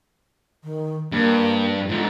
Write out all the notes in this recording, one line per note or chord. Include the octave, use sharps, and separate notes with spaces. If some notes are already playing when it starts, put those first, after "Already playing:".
D#3
G2 A#3
G#2 D3 F4